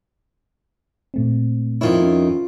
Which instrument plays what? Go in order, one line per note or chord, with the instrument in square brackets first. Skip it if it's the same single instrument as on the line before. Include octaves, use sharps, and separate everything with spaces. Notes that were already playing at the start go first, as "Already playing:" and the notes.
[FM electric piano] A#2 A3 C4
[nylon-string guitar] F2 D#3 E4 [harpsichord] F4 C#5
[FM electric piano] C#4